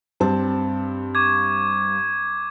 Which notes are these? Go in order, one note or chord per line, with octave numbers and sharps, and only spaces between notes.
G2 C4 A5
C#6 D6 G#6